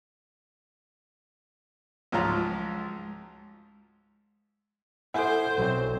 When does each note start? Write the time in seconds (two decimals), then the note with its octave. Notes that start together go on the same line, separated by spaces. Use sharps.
2.12 C#2 G#2 F3 F#3 F4 A#5
5.14 E4 A4 C5 F#5 G#5
5.58 B1 F#3 C4